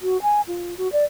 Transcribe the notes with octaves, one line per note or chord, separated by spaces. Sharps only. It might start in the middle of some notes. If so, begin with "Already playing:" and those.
F#4
G#5
F4
F#4
D5